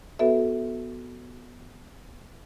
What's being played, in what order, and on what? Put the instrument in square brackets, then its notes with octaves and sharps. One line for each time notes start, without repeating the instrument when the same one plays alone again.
[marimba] B3 F#4 A4 B4 E5